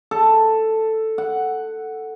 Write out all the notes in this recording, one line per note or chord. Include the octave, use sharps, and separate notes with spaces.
A4
F#5